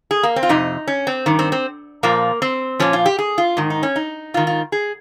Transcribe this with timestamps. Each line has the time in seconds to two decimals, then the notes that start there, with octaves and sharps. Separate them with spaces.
0.11 G#4
0.23 A#3
0.36 C4
0.43 F4
0.49 F2 C3 D#4
0.87 C#4
1.07 C4
1.26 G2 D#3
1.39 C4
1.52 C4
2.03 A#2 F3 A#3
2.42 C4
2.80 A#2 F3 C#4
2.93 F4
3.06 G4
3.19 G#4
3.38 F4
3.57 G#2 D#3
3.70 D#4
3.83 C#4
3.96 D#4
4.34 G#2 D#3 F4
4.47 F4
4.72 G#4